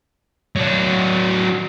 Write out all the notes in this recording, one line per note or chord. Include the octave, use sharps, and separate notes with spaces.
F#3 D4